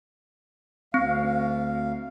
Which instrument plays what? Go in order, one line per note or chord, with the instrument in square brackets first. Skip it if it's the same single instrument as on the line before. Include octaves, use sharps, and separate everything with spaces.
[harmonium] D2 F5 [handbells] C4